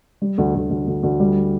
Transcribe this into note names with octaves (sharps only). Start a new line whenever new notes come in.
G3
D2
D2
D2
D2
D2
G3